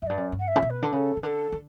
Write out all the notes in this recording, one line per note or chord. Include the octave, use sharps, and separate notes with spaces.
F#2 E5
G2 D5
F#2
G2
F#5
E5
C#3
B2
B4
D3
C#3 A4 B4
C#3
D3 A4 B4
D3